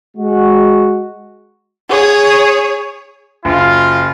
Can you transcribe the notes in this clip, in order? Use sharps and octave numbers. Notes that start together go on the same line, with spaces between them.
G#3 F#4
G#4 C#5
F#1 F4